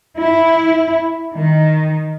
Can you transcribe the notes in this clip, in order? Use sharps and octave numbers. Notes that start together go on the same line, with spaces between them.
E4
D#3